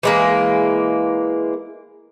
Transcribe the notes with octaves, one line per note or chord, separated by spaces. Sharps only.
E3 G#3 A#3